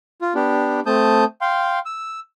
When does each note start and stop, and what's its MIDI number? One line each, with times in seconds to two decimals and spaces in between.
0.22 0.33 65
0.35 0.80 59
0.35 0.80 62
0.35 0.80 67
0.86 1.24 57
0.86 1.24 60
0.86 1.24 81
0.86 1.24 87
0.86 1.24 91
1.41 1.79 77
1.41 1.79 79
1.41 1.79 84
1.86 2.20 88